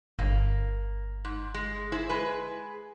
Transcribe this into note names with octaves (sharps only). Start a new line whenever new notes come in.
G1 A#3
G#2
G#3
E4 G#4 C5
G#3 G#4 B4